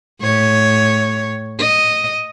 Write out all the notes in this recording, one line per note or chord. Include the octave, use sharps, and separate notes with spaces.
A2 C#5
D#5